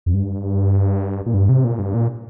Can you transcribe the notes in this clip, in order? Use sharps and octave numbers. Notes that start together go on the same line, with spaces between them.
F2
G2
A#2
G2
C3
A#2
G2
A#2